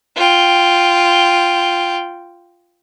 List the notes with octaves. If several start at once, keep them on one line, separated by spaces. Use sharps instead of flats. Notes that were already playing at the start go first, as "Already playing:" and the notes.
F4 G5